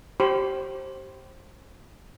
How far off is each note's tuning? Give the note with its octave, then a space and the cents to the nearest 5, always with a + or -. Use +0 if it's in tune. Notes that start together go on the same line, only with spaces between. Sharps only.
G4 -20 C5 +20 B5 +35